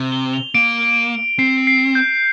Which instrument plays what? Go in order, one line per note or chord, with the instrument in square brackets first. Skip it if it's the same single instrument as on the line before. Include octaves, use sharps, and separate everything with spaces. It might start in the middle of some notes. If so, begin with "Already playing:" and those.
Already playing: [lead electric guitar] C3
[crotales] G7
F7
[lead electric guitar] A#3 [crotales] D7
[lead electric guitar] C4 [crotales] C7
[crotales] C7
G6